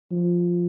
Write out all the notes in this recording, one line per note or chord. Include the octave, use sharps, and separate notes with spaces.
F3